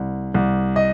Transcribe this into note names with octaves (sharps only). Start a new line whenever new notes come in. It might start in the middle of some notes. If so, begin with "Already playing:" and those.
Already playing: C2
C2
D#5